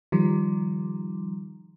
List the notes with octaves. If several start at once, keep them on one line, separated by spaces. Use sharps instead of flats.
D#3 F3 G3